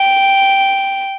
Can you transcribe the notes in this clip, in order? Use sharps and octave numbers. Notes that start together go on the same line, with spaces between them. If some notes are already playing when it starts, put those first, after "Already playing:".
Already playing: G5